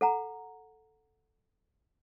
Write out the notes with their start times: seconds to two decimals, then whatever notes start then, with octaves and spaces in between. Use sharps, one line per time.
0.01 A4 F#5 A#5